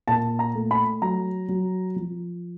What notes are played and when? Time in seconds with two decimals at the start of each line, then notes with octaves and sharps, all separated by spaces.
0.08 A#2 A5
0.39 A#5
0.55 A3
0.71 B5
1.02 F#3 A#5
1.49 F#3
1.96 F3